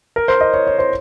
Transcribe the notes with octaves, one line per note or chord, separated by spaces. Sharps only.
A#4
C5
D#5
C#5
C#5
C5